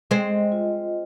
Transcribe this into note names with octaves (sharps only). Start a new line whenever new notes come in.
G#3 C4 D#5
F4